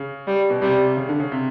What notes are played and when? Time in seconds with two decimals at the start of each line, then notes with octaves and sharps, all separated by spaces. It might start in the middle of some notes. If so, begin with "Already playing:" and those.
Already playing: C#3
0.28 G3
0.50 B2
0.62 C3 G3
0.97 C#3
1.09 D3
1.20 C#3
1.32 C3